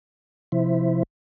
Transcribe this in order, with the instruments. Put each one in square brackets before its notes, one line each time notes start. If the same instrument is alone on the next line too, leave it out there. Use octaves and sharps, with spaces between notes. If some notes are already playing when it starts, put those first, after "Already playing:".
[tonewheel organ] C3 F3 E4 C5 E5